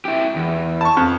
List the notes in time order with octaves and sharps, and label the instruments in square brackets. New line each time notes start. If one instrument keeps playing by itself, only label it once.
[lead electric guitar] E4 G4
E2
[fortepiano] A5 C#6
F2